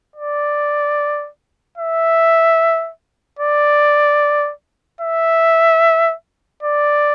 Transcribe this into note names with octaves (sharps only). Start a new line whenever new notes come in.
D5
E5
D5
E5
D5